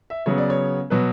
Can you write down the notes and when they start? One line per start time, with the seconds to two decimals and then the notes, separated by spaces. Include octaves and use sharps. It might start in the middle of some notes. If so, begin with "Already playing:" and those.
0.10 E5
0.26 C#3 F#3 B3 C#5
0.38 D5
0.50 C#5
0.90 B2 F#3 B4